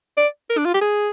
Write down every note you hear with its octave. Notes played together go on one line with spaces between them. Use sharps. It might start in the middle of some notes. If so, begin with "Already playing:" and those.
D5
A#4
D4
F4
G4
G#4